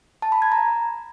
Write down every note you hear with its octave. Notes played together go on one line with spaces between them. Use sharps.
A5
B5
G#6
A#5